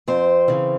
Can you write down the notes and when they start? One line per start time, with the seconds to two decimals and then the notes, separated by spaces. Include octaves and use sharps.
0.08 F2 C4 C5
0.48 C#3 E3